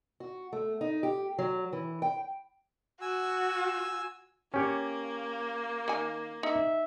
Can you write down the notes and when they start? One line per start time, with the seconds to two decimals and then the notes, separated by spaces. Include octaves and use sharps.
0.20 F#4
0.53 A3
0.81 D#4
1.03 G4
1.38 F#3
1.73 E3
2.02 G5
3.01 F#4 G#5 E6
4.54 A#3 C#4 G4 C#5
5.88 D#3 G#5
6.43 D#4 E5